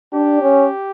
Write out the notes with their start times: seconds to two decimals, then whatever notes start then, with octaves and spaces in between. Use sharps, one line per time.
0.13 D4 G4
0.41 C#4